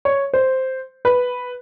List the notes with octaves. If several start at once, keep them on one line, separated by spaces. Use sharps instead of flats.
C#5
C5
B4